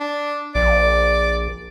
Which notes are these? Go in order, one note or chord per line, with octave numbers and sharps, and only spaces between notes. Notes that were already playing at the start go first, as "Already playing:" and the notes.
D4
A#1 D5